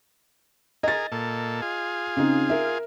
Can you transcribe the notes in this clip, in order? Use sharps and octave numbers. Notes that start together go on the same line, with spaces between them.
G#4 A#4 D#5 A6
A#2 A4
F4 G#4
C#3 C4 D#4
A#4 E5